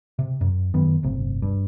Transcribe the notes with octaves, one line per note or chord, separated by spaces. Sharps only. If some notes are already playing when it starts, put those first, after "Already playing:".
C3
F#2
F#2 D#3 B3
D1 G1 C3
G2